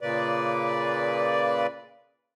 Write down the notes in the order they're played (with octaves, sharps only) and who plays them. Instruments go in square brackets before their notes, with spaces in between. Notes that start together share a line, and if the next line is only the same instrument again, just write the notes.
[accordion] A#2 C#3 A#3 B4 D5